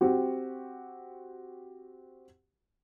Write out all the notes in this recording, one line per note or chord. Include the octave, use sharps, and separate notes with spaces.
C4 F#4 G4